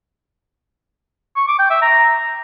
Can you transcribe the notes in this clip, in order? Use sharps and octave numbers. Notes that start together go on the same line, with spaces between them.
C#6
D6
G5
E5
A#5